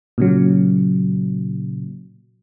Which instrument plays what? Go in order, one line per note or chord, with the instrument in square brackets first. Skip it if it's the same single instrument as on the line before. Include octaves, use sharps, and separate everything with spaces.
[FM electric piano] A#2 C#3 F#3